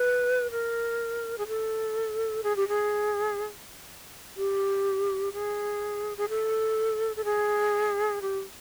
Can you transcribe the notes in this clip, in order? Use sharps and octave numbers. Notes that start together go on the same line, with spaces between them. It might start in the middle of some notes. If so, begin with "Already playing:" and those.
Already playing: B4
A#4
G#4
A4
G#4
G4
G#4
G4
G#4
G#4
A4
A4
G#4
G4